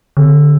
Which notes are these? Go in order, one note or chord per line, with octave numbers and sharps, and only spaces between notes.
D3